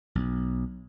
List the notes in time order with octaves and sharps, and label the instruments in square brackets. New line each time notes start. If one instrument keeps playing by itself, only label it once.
[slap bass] B1